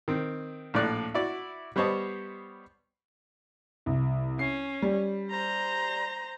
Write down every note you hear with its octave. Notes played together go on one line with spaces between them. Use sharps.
D#3 C4
A#1 A2 D5 F#6
E4 F#4 D5
G3 B3 C5 C#5 D#5 A5
C2
C#4 C7
G3
C5 A#5